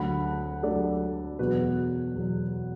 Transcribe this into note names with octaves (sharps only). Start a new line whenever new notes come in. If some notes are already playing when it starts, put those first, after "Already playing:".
Already playing: D2 D3 F#3 F#5 B5
D2 D3 F#3 A4 D5
E2 B2 F#3 F#4 B4
E2 B2 F#3